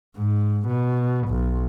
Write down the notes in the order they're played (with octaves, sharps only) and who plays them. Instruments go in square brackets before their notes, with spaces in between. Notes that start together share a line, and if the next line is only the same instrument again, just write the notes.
[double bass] G#2
B2
B1